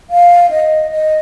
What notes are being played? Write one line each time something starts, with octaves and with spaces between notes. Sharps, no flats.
F5
D#5
D#5